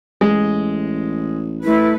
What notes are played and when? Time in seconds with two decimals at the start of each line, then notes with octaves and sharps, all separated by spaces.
0.21 A1 G#3
1.64 A3 E4 B4